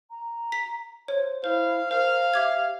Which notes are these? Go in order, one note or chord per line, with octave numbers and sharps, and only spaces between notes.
A#5
B6
C5 C#5
E4 C5 F5
A#4 C5 F5
G4 E5 D6 G#6